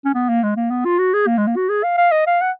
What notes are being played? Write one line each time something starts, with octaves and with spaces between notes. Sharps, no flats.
C#4
B3
A#3
G#3
A#3
B3
F4
F#4
G#4
A#3
G#3
A#3
F#4
G#4
F5
F5
D#5
F5
F#5